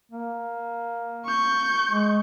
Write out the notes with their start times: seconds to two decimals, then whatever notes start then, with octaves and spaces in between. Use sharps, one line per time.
0.12 A#3
1.26 C#6 G6
1.89 G#3